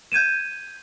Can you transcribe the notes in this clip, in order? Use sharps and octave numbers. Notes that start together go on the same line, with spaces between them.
G6 G#6 D#7 E7